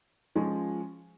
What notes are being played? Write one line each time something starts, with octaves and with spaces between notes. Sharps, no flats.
F3 G#3 C#4 F4